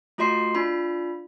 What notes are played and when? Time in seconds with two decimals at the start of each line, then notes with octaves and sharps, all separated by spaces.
0.18 A3 F4 F#4 D#5 C6 C7
0.55 D4 F4 B5